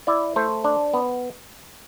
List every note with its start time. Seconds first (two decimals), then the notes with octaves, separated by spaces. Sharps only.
0.07 E4 D5
0.36 A3 C5
0.64 D4
0.94 B3